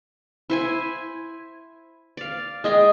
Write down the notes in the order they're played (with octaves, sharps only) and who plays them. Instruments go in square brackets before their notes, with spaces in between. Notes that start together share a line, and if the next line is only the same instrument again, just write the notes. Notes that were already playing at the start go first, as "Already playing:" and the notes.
[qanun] E4 C5 G#5
D5 F5
[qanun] G#3 G#4 G5 [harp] D#5